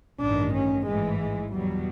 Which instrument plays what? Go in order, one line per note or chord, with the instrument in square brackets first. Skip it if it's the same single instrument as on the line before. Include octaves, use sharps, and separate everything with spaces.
[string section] A1 G2 D#3 [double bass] D4
[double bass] C#4
[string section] A1 G#2 E3 [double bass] G#3
[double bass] G#3
[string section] E2 B2 F#3 [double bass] G3